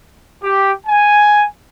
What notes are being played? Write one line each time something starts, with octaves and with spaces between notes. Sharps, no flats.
G4
G#5